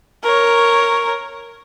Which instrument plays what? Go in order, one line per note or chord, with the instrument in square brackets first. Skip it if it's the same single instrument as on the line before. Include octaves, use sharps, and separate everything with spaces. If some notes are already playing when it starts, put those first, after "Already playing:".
[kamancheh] A#4 C#5